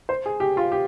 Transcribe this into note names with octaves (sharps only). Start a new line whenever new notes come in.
C5
G#4
G4
F4
G4